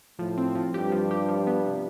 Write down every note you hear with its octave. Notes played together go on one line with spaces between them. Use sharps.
A2 F3
C4
F3
G2 G4
F3
G4
F3
B3
C3